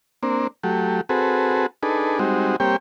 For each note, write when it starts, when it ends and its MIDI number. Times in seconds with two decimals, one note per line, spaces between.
0.23 0.47 58
0.23 0.47 60
0.23 0.47 62
0.63 1.01 54
0.63 1.01 57
0.63 1.01 67
1.09 1.66 60
1.09 1.66 66
1.09 1.66 68
1.09 1.66 69
1.09 1.66 71
1.83 2.19 62
1.83 2.19 63
1.83 2.19 68
1.83 2.19 69
1.83 2.19 71
2.19 2.56 55
2.19 2.56 56
2.19 2.56 60
2.19 2.56 63
2.19 2.56 66
2.60 2.76 55
2.60 2.76 58
2.60 2.76 60
2.60 2.76 67
2.60 2.76 73
2.60 2.76 79